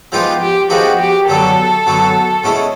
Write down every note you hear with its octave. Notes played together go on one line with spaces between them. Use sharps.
F3 G#3 B3 D#4 F4 G4
G4
F3 G#3 B3 D#4 F#4 G4
G4
F#2 D3 F#3 B3 A4
F#2 D3 F#3 B3
B2 G#3 C#4 E4 G#4